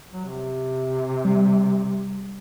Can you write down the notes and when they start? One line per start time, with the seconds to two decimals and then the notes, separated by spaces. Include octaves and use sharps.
0.13 F#3
0.25 C3
1.25 G3